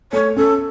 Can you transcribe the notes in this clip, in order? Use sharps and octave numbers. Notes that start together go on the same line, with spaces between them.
A3 C#5
C#4 A4